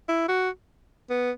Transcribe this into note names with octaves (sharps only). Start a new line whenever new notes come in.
E4
F#4
B3